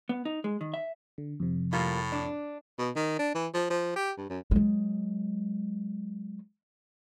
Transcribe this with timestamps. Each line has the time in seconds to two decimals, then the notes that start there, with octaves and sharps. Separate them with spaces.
0.09 B3
0.25 D#4
0.44 G#3
0.61 D#3
0.74 E5
1.18 D3
1.40 F2 C3
1.73 A2 G3 A#3 F4
2.12 D4
2.79 B2
2.96 D#3
3.19 D4
3.35 E3
3.54 F3
3.70 F3
3.96 G4
4.18 G2
4.30 F#2
4.51 F#3 G#3